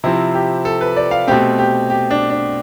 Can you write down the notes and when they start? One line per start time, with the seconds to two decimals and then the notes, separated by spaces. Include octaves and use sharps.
0.04 C3 F3 C4 E4
0.34 G4
0.65 A4
0.81 B4
0.97 D5
1.11 F5
1.27 B2 A3 C4 G4
1.59 G4
1.90 G4
2.11 D4
2.30 D4